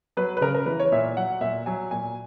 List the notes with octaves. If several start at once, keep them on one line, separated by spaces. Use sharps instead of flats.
F#3 B4
B4
C#3 A#4
A#4
E3 B4
C#5
A#2 E5
F#3 F#5
A#2 E5
F#3 G#5
A#2 G#5